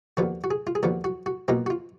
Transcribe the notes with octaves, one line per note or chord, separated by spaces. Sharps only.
D#2 D3 F3 B3 F#4
F#4
G#4
F4
G#4
D#2 D3 F3 B3 F#4
F#4
F#4
B1 B2 A#3 D#4 F4
F#4
F4